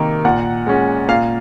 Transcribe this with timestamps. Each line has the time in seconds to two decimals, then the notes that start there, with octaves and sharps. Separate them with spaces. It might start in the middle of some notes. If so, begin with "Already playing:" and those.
Already playing: C3 D#3 A#3
0.25 A#2 F#5
0.67 G#3 C#4
1.08 A#2 F5